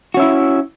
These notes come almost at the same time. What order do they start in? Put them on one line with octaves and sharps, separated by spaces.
F#4 C#4 E5 E4